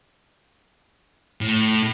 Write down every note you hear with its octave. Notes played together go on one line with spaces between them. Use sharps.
A2